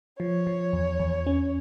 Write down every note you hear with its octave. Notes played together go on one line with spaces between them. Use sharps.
F3 C#5
F3
E2
E2
C#4